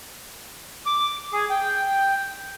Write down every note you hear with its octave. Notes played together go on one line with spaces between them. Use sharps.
D6
G#4
G5